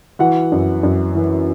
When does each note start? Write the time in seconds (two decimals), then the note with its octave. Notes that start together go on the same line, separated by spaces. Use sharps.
0.19 E3 F#4 F#5
0.52 F#2
0.83 F#2
1.15 E3